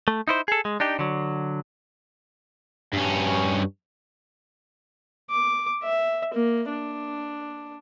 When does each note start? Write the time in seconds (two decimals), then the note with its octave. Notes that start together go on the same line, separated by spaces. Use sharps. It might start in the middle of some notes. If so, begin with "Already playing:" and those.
0.08 A3
0.28 D#4 E4 C5
0.48 G#4 A4
0.65 G#3
0.80 D4 D#4 G4
0.99 D3 F#3
2.93 G2 C#4
5.30 D6
5.83 E5
6.34 A#3
6.69 D4